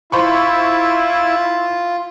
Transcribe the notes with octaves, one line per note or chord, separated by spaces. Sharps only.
E4 F4 C5 B5 C#6